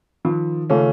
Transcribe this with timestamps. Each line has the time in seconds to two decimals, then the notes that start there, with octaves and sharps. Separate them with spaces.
0.25 D#3 F3
0.70 C#3 A3 C#4 F4 A4